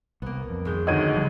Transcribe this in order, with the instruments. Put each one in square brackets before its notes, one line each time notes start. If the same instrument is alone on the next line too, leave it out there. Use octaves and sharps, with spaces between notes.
[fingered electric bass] C2 [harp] A#3 B3
[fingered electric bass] F2
[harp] G#1 G#3 G6
[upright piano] D2 D#3 [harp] D3 [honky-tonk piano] D#5 G#6 D#7
[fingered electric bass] C#3 F3 G3